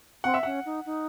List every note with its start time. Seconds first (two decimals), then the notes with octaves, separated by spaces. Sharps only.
0.24 C4 F#5
0.34 E5
0.43 C#4 F#5
0.65 D#4
0.86 D#4